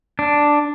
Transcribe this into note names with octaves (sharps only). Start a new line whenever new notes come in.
D4